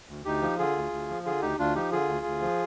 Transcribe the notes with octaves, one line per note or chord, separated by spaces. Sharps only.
D2
D2 D#4 G4
F3
D3 F4 G#4
D2
D2
F3
D3 F4 G#4
D2 D#4 G4
D2 D4 F4
F3 D#4 G4
D3 F4 G#4
D2
D2
F3